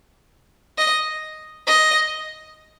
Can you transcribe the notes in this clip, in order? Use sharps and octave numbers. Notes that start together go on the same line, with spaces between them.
D#5
D#5